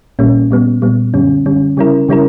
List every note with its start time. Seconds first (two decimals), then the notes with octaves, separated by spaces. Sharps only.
0.19 A#1 A#2 G3 A#3 C#4
0.51 A#2 G3 B3
0.82 A#2 G3 B3
1.14 F#2 D3 G3 C#4
1.46 F#2 D3 G3 C#4
1.77 C#3 G3 C#4 E4 A#4
2.08 C#3 G3 C#4 E4 A#4